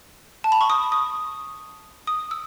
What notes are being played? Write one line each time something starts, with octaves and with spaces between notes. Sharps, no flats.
A5
B5
C#6
D#6
D#6
D#6
E6